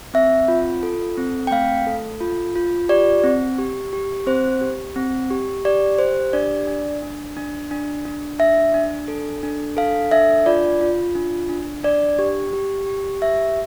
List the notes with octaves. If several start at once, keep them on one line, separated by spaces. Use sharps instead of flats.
C4 E5
F4
A4
C4
G5
A3 F5
A4
F4
F4
G4 D5
C4
G4
G4
C4 C5
G4
C4
G4
G4 D5
G4 C5
D4 D5
D4
D4
D4
D4
D4
D4 E5
D4
A4
D4
A4 F5
D4 E5
F4 D5
F4
D4
D4
D4 D5
G4
G4
G4
G4 E5